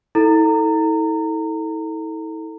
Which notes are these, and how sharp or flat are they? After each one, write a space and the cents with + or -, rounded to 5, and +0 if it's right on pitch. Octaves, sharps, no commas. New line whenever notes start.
E4 -40 A4 +0 A#5 -25